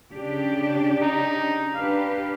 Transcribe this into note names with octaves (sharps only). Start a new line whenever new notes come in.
C#3 D4 G4
D#4
D4 G4 B4 F5